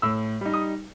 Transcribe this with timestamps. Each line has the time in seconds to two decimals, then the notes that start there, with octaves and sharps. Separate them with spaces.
0.02 A2 E6
0.41 G3 D#4
0.54 D#6